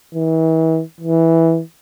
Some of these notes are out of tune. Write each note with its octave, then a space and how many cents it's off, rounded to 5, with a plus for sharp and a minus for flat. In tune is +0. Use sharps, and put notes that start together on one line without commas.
E3 -35
E3 -5